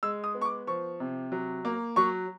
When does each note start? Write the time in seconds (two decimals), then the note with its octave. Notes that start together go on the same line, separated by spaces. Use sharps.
0.03 G#3 E6
0.24 D#6
0.34 B3
0.41 C#6
0.45 D6
0.67 F3 C#6
1.00 C3
1.32 F#3
1.65 A#3
1.96 F#3 C#6